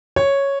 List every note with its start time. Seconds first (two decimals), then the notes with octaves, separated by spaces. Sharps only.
0.16 C#5